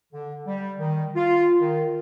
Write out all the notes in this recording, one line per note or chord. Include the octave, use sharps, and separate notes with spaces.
D3
G3
D#3
F4
D#3